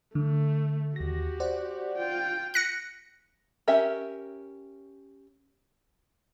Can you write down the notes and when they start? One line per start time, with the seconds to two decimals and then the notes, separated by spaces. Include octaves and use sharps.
0.15 D3 A3
0.96 D#2 F#4 G4 A#6
1.40 C5 D5 F#5
1.98 F4 G5
2.54 F#6 A#6 C#7
3.68 C#4 G4 A#4 E5